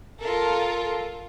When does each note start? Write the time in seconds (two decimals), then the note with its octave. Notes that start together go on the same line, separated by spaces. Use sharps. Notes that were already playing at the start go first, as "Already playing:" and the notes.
0.21 F4 A4 A#4